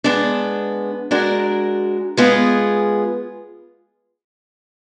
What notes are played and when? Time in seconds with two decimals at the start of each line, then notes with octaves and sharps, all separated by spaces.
0.04 G#3 B3 D4
1.11 G#3 D4 F#4 A#4
2.17 G#3 B3 F4 G#4